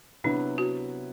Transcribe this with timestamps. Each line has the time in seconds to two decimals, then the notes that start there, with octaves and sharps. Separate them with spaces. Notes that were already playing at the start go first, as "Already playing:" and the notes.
0.24 C3 F#3 B3 D4 E4 B4
0.58 F#4